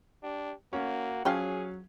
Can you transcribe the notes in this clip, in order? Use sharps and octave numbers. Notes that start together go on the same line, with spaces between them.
D4 G4
A#3 C#4 F#4
C#3 F3 F#3 C#4 G#4 F5 G5